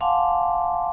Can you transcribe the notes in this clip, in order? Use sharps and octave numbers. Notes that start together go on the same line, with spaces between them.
F5 F#5 G#5 A5 C6 D6